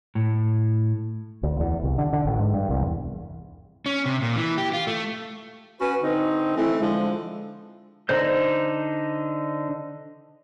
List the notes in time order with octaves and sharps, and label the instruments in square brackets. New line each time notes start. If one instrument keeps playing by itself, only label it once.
[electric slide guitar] A2
[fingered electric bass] D2
E2
C2
D3
D3
A1
G#2
G2
C2
E2
[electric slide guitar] C#4
C3
A#2
E3
G4
F4
A3
[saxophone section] C#4 F#4 B4
D3 C4 D#4
E3 A3 C4 E4
D3 F3 G#3
[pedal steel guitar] D3 D#4 C5 G6